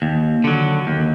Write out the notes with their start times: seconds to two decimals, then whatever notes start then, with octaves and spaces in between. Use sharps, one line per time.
0.02 D#2
0.44 D3 F#3
0.87 D#2